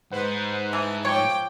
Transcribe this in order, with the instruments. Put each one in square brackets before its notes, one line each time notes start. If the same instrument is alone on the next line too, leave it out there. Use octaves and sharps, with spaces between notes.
[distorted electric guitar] G#2 [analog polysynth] B4 C5 F#5
[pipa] E3 [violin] A5
[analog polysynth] F3 [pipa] C#5 [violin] G5 D6